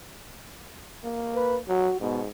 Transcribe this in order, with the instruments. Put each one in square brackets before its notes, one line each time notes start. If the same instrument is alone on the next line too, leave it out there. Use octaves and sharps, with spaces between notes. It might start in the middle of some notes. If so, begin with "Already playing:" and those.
[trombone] A#3
[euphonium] B4
[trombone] F#3 [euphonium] F#4
[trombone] G#2 [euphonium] B2